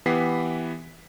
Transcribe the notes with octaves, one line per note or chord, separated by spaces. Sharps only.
E3 B3 G4 F#5 B6 C7